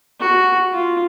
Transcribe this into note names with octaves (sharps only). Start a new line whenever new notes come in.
F#4
F4